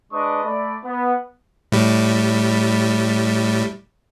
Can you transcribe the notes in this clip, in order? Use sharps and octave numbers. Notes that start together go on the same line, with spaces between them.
G#3 D4 B4 D#5 C#6 D#6
A3 D5 B5
B3
A2 G3